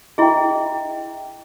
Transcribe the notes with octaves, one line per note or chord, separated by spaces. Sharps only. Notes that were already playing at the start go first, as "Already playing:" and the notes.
E4 G#4 D#5 E5 G5